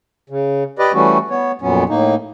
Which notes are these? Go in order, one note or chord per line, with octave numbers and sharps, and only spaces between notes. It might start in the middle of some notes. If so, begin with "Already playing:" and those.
C#3
G4 B4 D5 D#5
E3 G3 A3 C#4 F#4
B3 C#5
F2 A#2 F#3 B3 C#4
A2 A#3 D#4